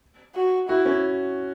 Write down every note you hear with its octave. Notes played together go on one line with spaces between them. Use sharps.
F#4
E4 F#4
C#4